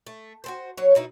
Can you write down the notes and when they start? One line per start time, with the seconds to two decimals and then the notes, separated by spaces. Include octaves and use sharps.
0.07 A3
0.44 F#4 A4 C5
0.77 F#3 C#5
0.95 B2 D#4 E4